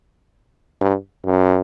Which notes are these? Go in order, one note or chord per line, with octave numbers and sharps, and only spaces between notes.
G2
F#2